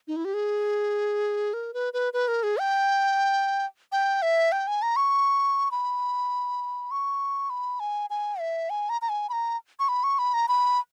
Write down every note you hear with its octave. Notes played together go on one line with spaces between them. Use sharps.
D#4
E4
G4
G#4
A#4
B4
B4
B4
A#4
G#4
G5
G5
E5
G5
G#5
A#5
C#6
B5
C#6
B5
G#5
G#5
E5
G#5
A#5
A#5
G#5
B5
A#5
C#6
B5
C#6
B5
A#5
B5